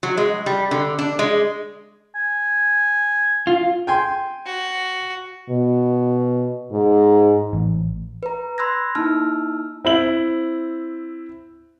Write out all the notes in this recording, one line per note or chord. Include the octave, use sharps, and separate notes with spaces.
F#3
G#3
G3
D3
D4
G#3
G#5
F4
G5 G#5 C6
F#4
B2
G#2
A1
B4 A#5
B5 C6 E6 F#6 G#6 A#6
A#3 D#4 E4 A5 E6 F6
C4 E4 F#7